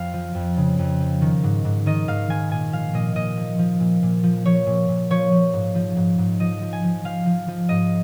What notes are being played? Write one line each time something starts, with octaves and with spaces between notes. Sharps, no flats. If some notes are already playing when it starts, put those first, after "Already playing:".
Already playing: F2 F5
F3
F2
C#3
F2
F3
D#3
G#2
G#2
D#3 D#5
G#2 F5
D#3 G#5
A#2 G#5
F3 F5
A#2 D#5
A#2 D#5
F3
F3
A#2
A#2
F3
F3 C#5
A#2
A#2
F3 C#5
F3
G#2
F3
G#2
G#2
F3 D#5
F3
G#5
F3
F3 F5
F3
F3
G#2 D#5